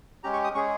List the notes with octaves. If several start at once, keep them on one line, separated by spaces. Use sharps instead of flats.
G#3 C#4 G4 A#5
C#6
D#6
G#3 C#4 G#4 C#6